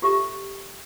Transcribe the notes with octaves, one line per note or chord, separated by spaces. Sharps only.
F4 G4 A4 C5 E5 C#6